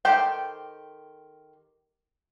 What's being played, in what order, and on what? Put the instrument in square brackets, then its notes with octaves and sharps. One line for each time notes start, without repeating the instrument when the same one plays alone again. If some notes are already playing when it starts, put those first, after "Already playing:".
[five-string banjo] D#3 G4 A4 C5 G5